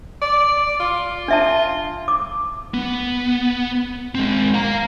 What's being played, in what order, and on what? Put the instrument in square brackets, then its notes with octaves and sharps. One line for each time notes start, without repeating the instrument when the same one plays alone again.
[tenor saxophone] D5
F4
[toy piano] D4 E5 A5
D6
[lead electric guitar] B3
G#3 C4
F5 A#5